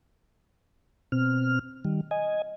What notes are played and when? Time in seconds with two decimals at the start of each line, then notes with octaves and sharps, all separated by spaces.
1.12 B2 C4 F6
1.85 D#3 G3
2.11 D#5 G#5